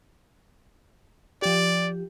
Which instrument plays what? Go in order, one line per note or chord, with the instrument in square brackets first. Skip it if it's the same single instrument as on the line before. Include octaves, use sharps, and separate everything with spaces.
[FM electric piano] F3 G4 [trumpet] D5